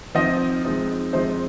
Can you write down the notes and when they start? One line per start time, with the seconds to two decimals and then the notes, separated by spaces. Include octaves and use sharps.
0.15 F3 C4 D#4 D#5
0.64 F3 G#3 C4 D#4
1.13 F3 G#3 C4 D#4 C5